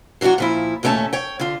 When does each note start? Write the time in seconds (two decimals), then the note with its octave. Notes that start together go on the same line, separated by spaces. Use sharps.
0.21 E3 F#3 D4 F4 F#4
0.38 A#2 F3 E4
0.83 D#2 A#2 A3 C#4 A5
1.13 C#5 G5
1.40 D3 F4